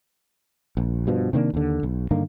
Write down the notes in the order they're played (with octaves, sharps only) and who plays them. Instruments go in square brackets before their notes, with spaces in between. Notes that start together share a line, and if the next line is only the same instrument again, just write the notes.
[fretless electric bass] A#1
G2 B2 F3
C3 D#3 A#3 D4
D#2 D3
B1
G2 D3 D#3 A#3